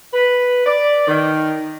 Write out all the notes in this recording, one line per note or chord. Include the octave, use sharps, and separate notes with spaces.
B4
D5
D#3